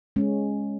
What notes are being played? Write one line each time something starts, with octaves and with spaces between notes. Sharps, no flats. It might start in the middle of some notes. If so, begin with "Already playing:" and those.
G#3 C#4